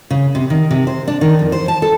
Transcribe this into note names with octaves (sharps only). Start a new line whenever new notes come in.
C#3
C3
D#3
C3
C5
D4
D#3
F2
C5
A5
A4